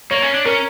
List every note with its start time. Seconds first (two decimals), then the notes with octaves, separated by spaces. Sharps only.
0.11 A#3 C#5
0.22 C#4
0.34 D4
0.46 C#4 A#4